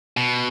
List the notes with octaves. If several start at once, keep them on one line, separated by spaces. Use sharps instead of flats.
B2